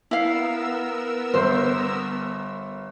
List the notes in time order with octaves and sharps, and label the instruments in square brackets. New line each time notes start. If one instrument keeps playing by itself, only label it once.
[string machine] B3 A#4 E6 [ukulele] E4 F5
[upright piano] G1 [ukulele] C5